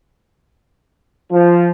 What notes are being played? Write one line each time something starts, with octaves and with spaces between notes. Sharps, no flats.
F3